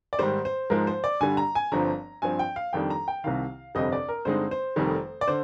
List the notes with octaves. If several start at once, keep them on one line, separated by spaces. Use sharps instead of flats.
D5
G#2 D#3 G3 C5
C5
G#2 F3 G#3 A#4
C5
D5
G2 D3 G3 G#5
A#5
G#5
G1 G2 F3 C4 A#5
G2 F3 C4 G#5
G5
F5
F2 D#3 G3 D4 G5
A#5
G5
C2 C3 D#3 F5
G1 F2 C3 G3 C4 D#5
D5
A#4
G2 D3 G#3 C4 D#4 C5
C5
F1 F2 D#3 G3
D5
D3 C5